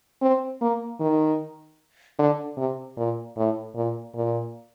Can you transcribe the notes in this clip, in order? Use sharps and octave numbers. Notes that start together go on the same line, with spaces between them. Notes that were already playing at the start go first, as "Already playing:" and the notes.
C4
A#3
D#3
D3
C3
A#2
A2
A#2
A#2